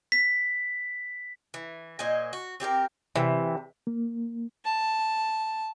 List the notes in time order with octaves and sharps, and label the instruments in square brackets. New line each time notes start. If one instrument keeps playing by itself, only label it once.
[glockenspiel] B6
[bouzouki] E3
A#2 C5 D#5 G#5
F#4
C4 G4 G#4 A#4
[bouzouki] C3 [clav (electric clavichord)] E3
[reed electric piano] A#3
[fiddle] A5